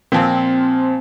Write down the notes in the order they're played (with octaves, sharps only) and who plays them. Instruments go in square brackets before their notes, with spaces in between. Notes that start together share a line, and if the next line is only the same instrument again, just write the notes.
[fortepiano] A#2 F3 [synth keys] C4